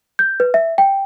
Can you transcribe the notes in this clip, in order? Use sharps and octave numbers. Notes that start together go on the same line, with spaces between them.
G6
B4
E5
G5